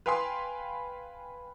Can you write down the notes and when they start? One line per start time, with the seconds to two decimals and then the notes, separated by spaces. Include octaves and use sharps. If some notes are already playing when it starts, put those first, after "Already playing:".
0.06 B4 F5 G5 G#5 B5 C6